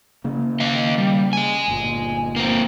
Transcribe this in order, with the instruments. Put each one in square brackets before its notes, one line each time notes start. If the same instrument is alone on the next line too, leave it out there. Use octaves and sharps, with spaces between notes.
[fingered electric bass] C#3 A#3
[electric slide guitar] D#3 D#5 F5
G3
D#5 G#5
[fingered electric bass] G1 A#2
[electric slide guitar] A#3 C4